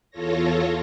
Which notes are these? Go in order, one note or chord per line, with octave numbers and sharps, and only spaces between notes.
E2 F4 A4 C#5 A#6